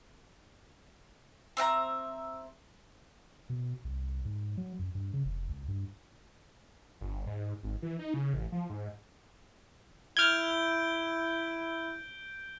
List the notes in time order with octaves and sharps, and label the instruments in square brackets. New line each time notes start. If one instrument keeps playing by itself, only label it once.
[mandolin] C4 E5 G5 A#5
[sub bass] B2
C2
G#2
F#3
F#2
G2
C#3
F1
C#2
G2
[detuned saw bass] G1
G#2
G#1
E3
D#4
C#3
A1
F3
G#2
[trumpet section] E4 [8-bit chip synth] F6 G#6 [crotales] G6 D7 G7